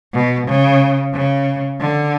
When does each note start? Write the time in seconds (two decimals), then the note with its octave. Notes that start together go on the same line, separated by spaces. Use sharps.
0.14 B2
0.48 C#3
1.14 C#3
1.80 D3